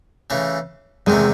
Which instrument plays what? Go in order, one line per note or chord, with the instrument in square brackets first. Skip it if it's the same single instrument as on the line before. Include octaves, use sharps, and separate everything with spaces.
[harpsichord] C#3 E3 A3
[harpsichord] E2 C3 D#3 A3 [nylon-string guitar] G#3